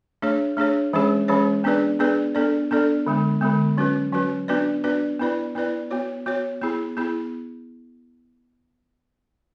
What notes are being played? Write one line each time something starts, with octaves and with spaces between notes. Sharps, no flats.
A3 D4 G#4 C#5
A3 D4 G#4 C#5
E3 G#3 C#4 G#4 C#5
E3 G#3 C#4 G#4 C#5
B3 D4 G#4 B4 D5
B3 D4 G#4 B4 D5
B3 D4 A4 D5
B3 D4 A4 D5
D3 G#3 B3
D3 G#3 B3
F#3 C#4 F#4 B4
F#3 C#4 F#4 B4
B3 D4 F#4 B4 D5
B3 D4 F#4 B4 D5
B3 E4 B4 D5
B3 E4 B4 D5
B3 F#4 C#5
B3 F#4 C#5
B3 E4 G#4
B3 E4 G#4